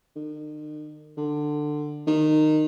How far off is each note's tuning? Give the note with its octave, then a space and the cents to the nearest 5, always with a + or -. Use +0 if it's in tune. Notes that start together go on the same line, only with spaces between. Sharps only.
D#3 -45
D3 +20
D#3 -15